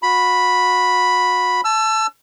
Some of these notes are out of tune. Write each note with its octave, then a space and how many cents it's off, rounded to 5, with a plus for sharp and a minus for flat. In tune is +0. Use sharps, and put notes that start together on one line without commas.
F#4 -35 B5 +0
A5 -15 E6 +30